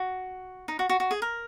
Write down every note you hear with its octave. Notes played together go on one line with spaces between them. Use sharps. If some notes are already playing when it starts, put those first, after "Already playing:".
Already playing: F#4
D#4
F#4
F#4
F#4
G#4
A#4